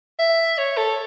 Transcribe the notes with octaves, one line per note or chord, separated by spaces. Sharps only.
E5
C#5
A4